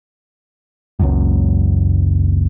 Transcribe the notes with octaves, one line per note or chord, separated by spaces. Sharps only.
F#1 C#2 F#2